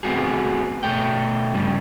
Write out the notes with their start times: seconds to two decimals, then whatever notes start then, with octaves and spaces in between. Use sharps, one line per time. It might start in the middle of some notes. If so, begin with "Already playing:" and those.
0.03 A3 B3 C4 F#4 G#4
0.83 B2 A3 G5
1.54 G2 C#3 G3